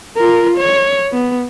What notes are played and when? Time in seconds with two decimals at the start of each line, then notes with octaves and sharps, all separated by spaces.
0.16 F4 A#4
0.57 C#5
1.12 B3